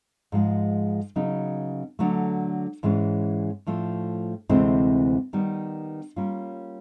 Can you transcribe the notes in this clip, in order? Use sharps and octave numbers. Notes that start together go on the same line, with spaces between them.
G#2 F3 G#3
C#3 F#3 B3 D#4
D3 F#3 A3
G#2 E3 G#3 C#4
A2 F3 A3 D4
D2 C3 E3 G#3 C4
D#3 G3 B3
G3 A#3 C#4 F4